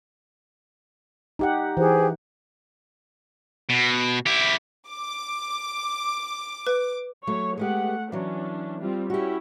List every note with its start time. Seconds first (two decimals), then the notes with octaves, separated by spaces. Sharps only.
1.39 D#4 G4 F#5
1.77 E3 G4 G#4 C5
3.69 B2
4.26 E4 G4
4.90 D6
6.67 B4
7.27 F#3 A3 C#5
7.57 G#3 A3 B3 G4 F#5
8.12 E3 F#3 C#4 D4
8.80 G3 C4 F4
9.10 C#4 E4 F#4 G4